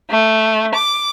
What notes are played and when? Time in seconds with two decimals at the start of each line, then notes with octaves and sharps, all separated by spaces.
0.10 A3
0.75 D6